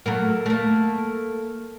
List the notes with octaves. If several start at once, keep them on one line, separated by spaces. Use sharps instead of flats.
F#3 A3 A#3
A3 A#3